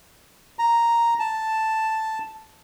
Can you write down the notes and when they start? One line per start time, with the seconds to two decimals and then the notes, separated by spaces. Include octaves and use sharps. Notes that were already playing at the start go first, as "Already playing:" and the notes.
0.59 A#5
1.20 A5